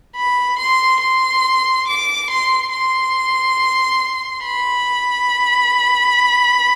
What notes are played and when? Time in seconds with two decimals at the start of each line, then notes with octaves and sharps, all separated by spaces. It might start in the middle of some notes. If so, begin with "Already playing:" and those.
0.16 B5
0.59 C6
1.01 C6
1.88 D6
2.30 C6
2.73 C6
4.45 B5